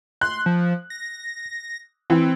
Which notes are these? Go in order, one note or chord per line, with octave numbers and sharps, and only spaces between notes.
C6 F#6
F3
A#6
E3 C4